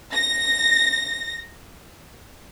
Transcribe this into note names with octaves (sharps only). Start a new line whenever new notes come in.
A#6